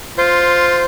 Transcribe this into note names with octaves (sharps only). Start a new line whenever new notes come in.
F4 C5